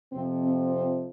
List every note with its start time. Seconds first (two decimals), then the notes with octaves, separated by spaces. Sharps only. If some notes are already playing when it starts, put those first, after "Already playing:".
0.13 F2 C3 F3 C4
0.42 C4
0.72 C4